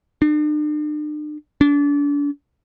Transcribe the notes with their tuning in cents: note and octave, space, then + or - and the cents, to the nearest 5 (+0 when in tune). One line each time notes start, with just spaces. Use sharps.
D4 +45
D4 -35